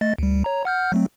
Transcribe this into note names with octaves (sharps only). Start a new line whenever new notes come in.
A3 D#5 A6
D2 G3
C#5 A#5
F#5 F6 G6
F#3 A3 C4